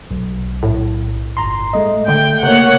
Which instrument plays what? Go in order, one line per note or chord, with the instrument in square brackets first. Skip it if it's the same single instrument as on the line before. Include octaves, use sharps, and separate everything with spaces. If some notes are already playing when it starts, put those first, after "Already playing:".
[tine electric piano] B1
[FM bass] A2
[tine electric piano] G1 A#5 C6
G#3 A3 D#5
[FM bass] D3 [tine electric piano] A3 [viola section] G5
[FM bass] C3 [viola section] A#3 C#5 F#5